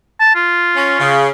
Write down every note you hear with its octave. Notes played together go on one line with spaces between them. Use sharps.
A5
F4
C#4
C#3